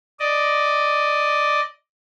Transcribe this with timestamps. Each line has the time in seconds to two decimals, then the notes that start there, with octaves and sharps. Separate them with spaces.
0.20 D5 D#5